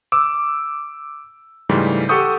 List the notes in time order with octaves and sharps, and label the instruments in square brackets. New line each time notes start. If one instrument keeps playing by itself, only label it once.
[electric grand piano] D6 E6
G#2 C#3 E3 G3 A3
G4 A4 F#5 C#6 D#6 G6